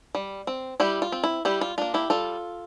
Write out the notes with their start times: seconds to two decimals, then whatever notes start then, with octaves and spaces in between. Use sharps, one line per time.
0.15 G3
0.47 C4
0.80 G3 E4 G4
1.02 F4
1.12 C4
1.24 E4
1.45 G3 E4 G4
1.61 F4
1.78 A#3 D4 F4
1.94 E4 G4
2.10 G3 F4 A4